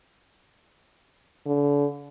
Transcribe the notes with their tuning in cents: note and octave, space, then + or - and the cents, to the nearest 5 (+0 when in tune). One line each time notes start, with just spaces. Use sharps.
D3 -35